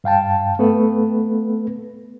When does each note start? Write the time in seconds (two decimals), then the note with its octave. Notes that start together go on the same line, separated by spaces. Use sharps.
0.04 G2 F5 G5 A5
0.59 A3 B3 A4 B4